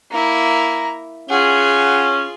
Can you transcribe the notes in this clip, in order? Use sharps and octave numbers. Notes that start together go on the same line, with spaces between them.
A#3 E4 A#5
C#4 F4 G#4 F#5